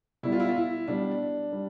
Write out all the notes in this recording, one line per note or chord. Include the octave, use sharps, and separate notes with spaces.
B2 G3 E4
F4
E4
F4
E4
B2 G3 D4
G3